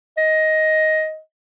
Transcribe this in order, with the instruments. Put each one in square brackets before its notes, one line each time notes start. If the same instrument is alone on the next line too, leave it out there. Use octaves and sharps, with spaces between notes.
[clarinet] D#5